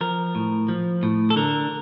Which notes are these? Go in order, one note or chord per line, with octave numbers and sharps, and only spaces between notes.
F3 A#4
A2
F3
A2
A4
D3 A#4